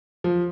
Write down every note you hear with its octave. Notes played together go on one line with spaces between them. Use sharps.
F3